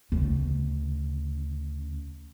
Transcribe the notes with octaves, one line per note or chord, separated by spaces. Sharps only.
D2 C#3